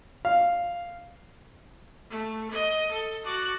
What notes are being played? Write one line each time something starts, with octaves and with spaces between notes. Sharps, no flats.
F5
A3
D#5
A4
F#4 D5